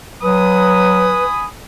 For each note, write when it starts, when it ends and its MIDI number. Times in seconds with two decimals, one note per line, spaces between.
0.22 1.20 54
0.22 1.24 71
0.22 1.46 80
0.22 1.46 83
0.22 1.46 87